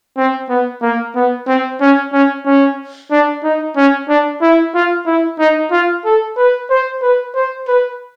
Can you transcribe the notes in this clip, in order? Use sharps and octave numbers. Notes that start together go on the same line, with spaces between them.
C4
B3
A#3
B3
C4
C#4
C#4
C#4
D4
D#4
C#4
D4
E4
F4
E4
D#4
F4
A4
B4
C5
B4
C5
B4